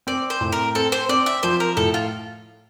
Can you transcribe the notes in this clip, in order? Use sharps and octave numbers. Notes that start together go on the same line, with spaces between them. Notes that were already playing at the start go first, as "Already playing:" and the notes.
C4 D5
C5
A2
A#4
C4 A4
C5
C4 D5
E5
F3 C5
A#4
A2 A4
F4